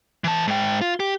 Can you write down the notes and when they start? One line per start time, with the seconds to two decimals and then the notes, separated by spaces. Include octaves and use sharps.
0.24 E3 A5
0.48 G#2 G5
0.81 F4
1.00 G4